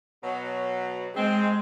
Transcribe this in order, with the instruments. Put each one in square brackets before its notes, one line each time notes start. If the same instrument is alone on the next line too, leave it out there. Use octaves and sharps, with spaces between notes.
[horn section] B2 F#3
[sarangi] G#3 [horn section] C4